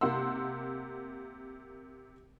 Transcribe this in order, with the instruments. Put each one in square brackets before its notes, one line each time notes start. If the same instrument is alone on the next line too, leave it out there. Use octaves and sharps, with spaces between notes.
[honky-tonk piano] C3 A#3 F#5 C6 E6